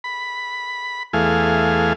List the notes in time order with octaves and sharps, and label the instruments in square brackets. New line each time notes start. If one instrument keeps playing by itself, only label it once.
[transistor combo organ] B5
E2 A3 G#4 F5